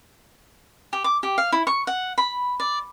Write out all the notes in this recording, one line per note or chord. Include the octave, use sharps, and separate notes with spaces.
G4
D6
G4
F5
E4
C#6
F#5
B5
D5